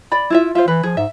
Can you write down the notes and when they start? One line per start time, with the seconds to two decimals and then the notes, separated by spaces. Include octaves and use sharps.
0.12 D5 B5
0.30 E4 F4 E5
0.55 F4 C5 E5
0.68 E3 B4
0.83 F3 G#4
0.97 G#2 E5